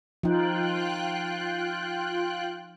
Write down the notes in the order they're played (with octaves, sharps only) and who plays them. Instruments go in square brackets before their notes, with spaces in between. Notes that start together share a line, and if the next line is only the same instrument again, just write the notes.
[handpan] F3 D#4 [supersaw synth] F4 G5 F#6